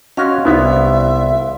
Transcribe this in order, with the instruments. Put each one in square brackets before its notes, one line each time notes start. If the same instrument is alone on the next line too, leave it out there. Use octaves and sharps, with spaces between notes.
[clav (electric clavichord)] C#4 F#4 D#5 [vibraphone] F5 C6
[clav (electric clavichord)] C2 B3 [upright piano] G3 E4 [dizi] E5